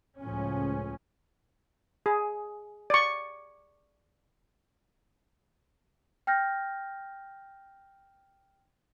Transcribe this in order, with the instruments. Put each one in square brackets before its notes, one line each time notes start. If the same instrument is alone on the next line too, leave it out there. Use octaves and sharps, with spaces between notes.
[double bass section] C#2 A2 F3 C#4
[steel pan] G#4
D5 C#6
[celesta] G5 F6 G6 A#6